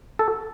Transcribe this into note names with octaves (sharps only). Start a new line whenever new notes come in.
A4